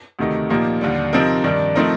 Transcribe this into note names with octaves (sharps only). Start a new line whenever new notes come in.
D2 C3 D#3 A3 D#4
A#2 F3 A#3 D#4 G4
D#2 D3 G3
C3 F3 C4 D#4 A#4
G2 D#3 G3 D4
F3 A3 C4 D#4 A#4